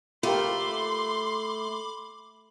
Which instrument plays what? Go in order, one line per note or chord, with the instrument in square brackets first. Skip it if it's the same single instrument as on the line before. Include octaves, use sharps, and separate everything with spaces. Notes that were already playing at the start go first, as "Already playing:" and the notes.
[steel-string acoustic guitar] A3 [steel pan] F4 G4 A#4 [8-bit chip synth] B5 D6 [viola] C6